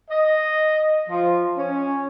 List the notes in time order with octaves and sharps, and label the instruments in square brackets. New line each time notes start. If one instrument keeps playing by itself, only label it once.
[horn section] D#5
F3
C#4